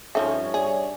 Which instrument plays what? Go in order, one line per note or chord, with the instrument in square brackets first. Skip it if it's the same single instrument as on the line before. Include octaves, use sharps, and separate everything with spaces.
[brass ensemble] G2 C#5 [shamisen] F3 D#4 A4 [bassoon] C#4 [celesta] E5
[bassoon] D4 [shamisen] G#4